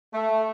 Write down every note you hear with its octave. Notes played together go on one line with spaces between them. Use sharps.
A3